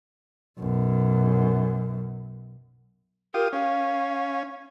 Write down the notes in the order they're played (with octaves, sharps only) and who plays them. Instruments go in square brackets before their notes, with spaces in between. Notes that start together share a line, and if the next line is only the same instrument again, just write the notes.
[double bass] B1 F#2
[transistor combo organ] F4 G4 D#6 [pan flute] A#4
[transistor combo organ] C#4 [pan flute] F5